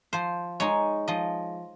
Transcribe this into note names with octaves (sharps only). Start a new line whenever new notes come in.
F3 C5
G#3 D#4 C#5
F3 D#5